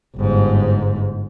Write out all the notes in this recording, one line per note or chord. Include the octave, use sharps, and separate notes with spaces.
G1 G#2